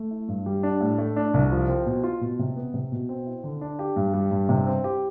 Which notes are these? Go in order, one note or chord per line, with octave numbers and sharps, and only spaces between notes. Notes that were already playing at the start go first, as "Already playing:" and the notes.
Already playing: A3
E4
G2
G3
D4
A2
A3
D4
C2
F3
C4
B2
F4
B2
C3
B3
C3
B2
C4
E4
D3
D4
G4
G2
G3
G2
C3
C4
G4